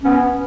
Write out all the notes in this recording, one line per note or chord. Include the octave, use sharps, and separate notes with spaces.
B3 C#4